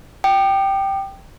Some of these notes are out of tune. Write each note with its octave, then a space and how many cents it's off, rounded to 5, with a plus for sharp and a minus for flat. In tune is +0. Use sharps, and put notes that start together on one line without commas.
G5 -5 D6 +45